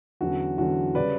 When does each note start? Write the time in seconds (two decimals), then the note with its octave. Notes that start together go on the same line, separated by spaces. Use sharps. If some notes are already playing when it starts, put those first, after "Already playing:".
0.21 E2 D3 F#3 C#4 F#4
0.58 E2 D3 F#3 C#4 F#4
0.95 C#3 G3 C#4 B4 D5